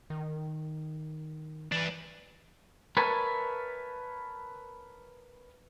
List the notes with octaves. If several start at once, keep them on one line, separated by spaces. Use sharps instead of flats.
D#3
E3 D4 B4
A#4 B4 C#5 E5 G#5 A5